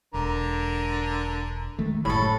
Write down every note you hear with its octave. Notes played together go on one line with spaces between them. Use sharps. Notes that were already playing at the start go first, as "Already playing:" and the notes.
E1 D3 A#4
D#3 G#3 A3
F#1 A2 A4 B5 C#6